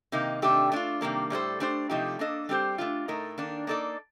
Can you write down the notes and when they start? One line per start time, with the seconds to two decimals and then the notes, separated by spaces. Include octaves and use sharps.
0.12 C3 D#3 A#3 D#4
0.42 C3 D#3 A3 D4 G4
0.72 A3 D4 F4
1.01 C3 D#3 G3 A#3 D4
1.30 A2 G3 D4 A4 C5
1.60 A3 D4 G4 C5
1.90 C3 F3 A3 D#4 G4
2.19 A#3 D4 A4 D#5
2.49 G3 C4 G4 C5
2.78 A3 D4 F4
3.08 A2 A3 D#4 A#4
3.38 D#3 A#3 D4
3.67 A#3 D#4 A4 D5